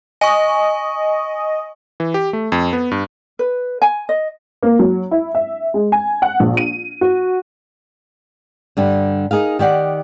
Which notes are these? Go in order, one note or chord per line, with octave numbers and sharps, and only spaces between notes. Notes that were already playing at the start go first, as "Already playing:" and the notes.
D#5 G#5 C#6
E3
G4
A3
F2
B3
G2
B4
G#5
D#5
A#3
F#3
E4
E5
G#3
G#5
F#5
A#1
D#7
F#4
G2 D3 G3
D#4 G#4 A#4 F5
D#3 G4 D5 F#5